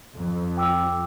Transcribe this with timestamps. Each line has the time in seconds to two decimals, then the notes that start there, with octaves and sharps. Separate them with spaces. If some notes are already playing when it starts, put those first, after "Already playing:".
0.16 F2
0.57 G5 D6 E6